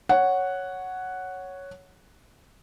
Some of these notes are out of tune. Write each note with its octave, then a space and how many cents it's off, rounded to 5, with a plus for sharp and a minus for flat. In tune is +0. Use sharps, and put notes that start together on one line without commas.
C#5 +0 F#5 +0